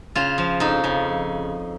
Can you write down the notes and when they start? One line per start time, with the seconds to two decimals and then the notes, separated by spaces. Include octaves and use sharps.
0.15 C#3 F4
0.38 F3
0.60 F2 D#4
0.84 C#3